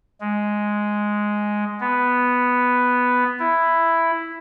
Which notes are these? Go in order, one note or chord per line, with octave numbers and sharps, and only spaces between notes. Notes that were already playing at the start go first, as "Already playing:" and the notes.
G#3
B3
E4